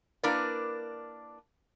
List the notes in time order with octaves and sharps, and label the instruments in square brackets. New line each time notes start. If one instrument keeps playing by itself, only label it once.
[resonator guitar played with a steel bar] A#3 D4 E4 A#4 B4 D5